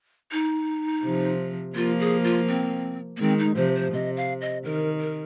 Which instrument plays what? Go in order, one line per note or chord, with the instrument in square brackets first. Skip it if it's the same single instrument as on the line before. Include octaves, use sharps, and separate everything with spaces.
[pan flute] D#4
[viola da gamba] C3 F3
[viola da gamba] F3 A#3 [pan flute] F4
[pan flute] G#4
F4
C4
A#3
[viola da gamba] D#3 G#3 [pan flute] C4
[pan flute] D#4
[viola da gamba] C3 F3 [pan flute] C5
[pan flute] C5
[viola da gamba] C3 [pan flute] D#5
[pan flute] F5
D#5
[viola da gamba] D#3 [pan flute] A#4
[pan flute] A#4